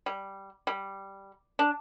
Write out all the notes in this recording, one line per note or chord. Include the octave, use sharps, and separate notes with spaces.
G3
G3
D4